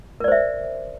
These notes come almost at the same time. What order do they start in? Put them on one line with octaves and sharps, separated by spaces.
A#4 D5 C5 E5